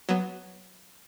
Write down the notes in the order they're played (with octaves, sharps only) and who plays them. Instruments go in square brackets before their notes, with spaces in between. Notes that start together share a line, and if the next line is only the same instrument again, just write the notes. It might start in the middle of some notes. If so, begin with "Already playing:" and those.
[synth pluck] F#3 B3